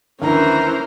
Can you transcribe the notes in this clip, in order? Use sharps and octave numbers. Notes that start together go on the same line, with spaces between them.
D#2 D3 E3 C#4 E4 A#4 C5 A#5